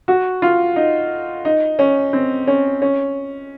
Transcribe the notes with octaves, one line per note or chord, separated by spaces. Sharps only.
F#4
F4
D#4
D#4
C#4
C4
C#4
C#4